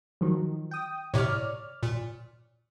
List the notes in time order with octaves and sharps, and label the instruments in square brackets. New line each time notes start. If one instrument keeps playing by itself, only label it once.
[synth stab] D#3 F3 F#3
G5 D#6
[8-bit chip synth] A2 C3 [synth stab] C#5 D5 F6
[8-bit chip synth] A#2